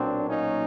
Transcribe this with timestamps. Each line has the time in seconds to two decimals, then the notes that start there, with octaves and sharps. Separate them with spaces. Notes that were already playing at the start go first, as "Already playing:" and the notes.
Already playing: B1 A#2 F#3 A#3 C4 D4
0.29 C#4 D#4